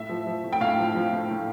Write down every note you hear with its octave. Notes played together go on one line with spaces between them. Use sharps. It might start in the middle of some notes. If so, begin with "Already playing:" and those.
Already playing: A2 E5
F3
F3
A2
G5
A2 F5
F3
F3
A2
A2